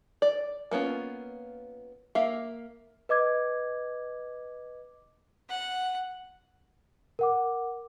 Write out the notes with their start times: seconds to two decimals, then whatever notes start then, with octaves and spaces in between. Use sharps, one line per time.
0.22 D5
0.71 A#3 B3 C#4 F4
2.15 A#3 E5 F5
3.09 B4 D#5 D6 G#6
5.50 F#5
7.19 A#4 F#5 D6